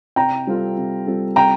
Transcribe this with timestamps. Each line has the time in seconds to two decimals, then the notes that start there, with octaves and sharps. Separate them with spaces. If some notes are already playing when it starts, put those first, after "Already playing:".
0.16 C3 G5 A#5
0.47 G3 C4 F4 A4
0.77 C3
1.07 G3 C4 F4 A4
1.36 C3 G5 A#5